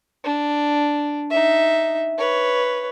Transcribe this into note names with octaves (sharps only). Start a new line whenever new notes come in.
D4
D#4 E5
B4 C#5